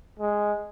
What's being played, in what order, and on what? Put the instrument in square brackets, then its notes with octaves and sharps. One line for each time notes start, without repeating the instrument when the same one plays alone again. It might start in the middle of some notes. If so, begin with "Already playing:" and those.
[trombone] G#3